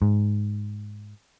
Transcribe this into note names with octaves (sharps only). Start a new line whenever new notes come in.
G#2